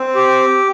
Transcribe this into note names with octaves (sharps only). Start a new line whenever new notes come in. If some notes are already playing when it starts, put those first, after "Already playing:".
Already playing: C4
G4